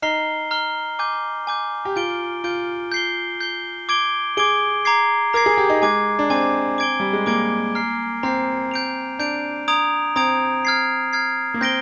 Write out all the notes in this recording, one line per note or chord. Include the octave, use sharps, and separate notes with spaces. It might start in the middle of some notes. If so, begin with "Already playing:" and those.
D#4 A#5 F6 C7 G7
A#5 F6 C7 G7
G#5 D6 G6
G#5 D6 G6
G4
F4 G6 D7 G7
F4 G6 D7 G7
G6 C7 G7
G6 C7 G7
D6 G#6 D7 G7
G#4 D6 G#6 D7 G7
A#5 D6 G#6 C7
A#4 A#5 D6 G#6 C7
G#4
G4
D#4
G#3 G#5 D6 G#6
D4
C4 G#5 D6 G#6
D6 G#6 D7 G7
G3
G#3
A#3 D6 G#6 D7 G7
A#5 F6 C7
C4 A#5 F6 C7
G6 D7 F7
D4 G6 D7 F7
A#5 D#6 G#6 D7 F7
C4 A#5 D#6 G#6 D7 F7
F6 G#6 C7
F6 G#6 C7
A#3
C4 G6 A#6 D7 G7